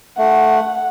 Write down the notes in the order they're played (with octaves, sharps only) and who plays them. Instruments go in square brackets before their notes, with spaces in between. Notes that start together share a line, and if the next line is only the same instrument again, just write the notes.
[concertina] A3 [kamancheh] F#5